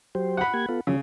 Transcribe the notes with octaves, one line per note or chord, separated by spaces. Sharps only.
F#3 G4 C5
F#5 B5
A#3 G4 G#6
B3 F4 A4
C#3 F3 F#3 C#4